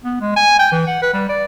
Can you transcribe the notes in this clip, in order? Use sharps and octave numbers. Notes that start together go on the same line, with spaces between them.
B3
G#3
G#5
G5
E3
F#5
B4
G3
D5